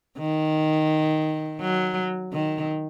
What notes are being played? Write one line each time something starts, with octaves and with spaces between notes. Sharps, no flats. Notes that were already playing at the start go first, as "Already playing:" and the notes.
D#3
F#3
D#3